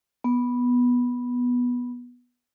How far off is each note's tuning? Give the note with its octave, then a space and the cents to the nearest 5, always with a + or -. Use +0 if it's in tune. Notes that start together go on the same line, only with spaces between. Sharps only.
B3 -10